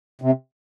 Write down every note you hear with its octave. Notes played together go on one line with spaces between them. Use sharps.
C3